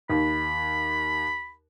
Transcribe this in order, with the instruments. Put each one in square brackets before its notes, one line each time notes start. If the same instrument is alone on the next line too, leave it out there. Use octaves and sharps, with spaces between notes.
[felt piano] D#2 [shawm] B5